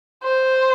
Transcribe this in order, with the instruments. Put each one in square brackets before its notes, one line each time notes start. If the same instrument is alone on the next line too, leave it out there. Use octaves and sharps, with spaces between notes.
[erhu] C5